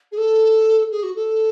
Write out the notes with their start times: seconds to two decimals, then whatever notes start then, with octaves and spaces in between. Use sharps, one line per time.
0.12 G#4
0.17 A4
0.91 G#4
1.03 F#4
1.15 A4